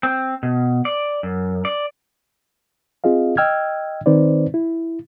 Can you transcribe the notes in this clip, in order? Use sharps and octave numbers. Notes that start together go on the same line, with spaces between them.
C4
B2
D5
F#2
D5
C4 F4 G#4 D#5 F5
D#5 G5 E6 F6 G#6
D#3 C4 D#4 B4 C5 D5
E4